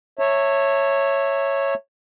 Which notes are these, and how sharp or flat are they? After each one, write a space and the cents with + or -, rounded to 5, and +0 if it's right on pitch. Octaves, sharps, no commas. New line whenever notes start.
C#5 -10 E5 +0 A5 +40